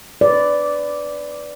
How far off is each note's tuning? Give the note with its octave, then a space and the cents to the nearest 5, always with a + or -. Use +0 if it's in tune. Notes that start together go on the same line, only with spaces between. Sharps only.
B4 +20 D5 -10